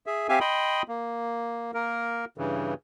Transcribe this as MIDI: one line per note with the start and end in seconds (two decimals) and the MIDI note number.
0.06 0.27 68
0.06 0.27 76
0.29 0.39 60
0.29 0.39 67
0.29 0.39 76
0.29 0.39 77
0.29 0.39 80
0.41 0.82 75
0.41 0.82 79
0.41 0.82 83
0.41 0.82 84
0.41 0.82 87
0.88 1.71 58
1.74 2.25 58
1.74 2.25 70
2.38 2.74 43
2.38 2.74 49
2.38 2.74 52